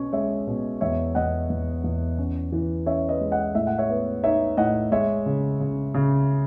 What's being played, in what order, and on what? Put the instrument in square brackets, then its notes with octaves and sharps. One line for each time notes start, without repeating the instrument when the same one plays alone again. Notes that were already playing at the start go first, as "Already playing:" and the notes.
Already playing: [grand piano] B2 C#4
G#3 C#5 E5
B2
E2 C#5 E5
E2 D#5 F#5
E2
E2
C#4
E3
C#4 C#5 E5
B4 D#5
G#3
D#5 F#5
A2 E5
F#5
C#5 E5
B3
D#4 C#5 E5
A2 D#5 F#5
G#3 C#5 E5
C#3
C#3
C#3